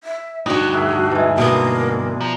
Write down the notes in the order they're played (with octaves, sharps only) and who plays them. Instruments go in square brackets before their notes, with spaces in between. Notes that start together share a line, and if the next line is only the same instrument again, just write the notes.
[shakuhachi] E5
[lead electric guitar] D2 G2 [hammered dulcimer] D4 [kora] D#4 C#5 [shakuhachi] F#4
[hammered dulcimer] G#4 A#4 E5
E3 G#3
[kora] B2 B3 [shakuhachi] A#3
[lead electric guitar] F3 [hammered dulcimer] A#5